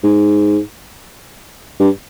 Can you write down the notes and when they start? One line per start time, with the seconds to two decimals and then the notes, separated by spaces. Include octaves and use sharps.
0.03 G#2
1.80 G2